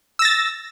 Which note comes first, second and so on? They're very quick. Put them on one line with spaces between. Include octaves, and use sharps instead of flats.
E6 A#6 A6